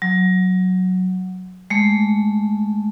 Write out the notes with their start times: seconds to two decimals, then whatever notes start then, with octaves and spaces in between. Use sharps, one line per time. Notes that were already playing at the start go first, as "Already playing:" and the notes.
0.02 F#3
1.70 G#3 A3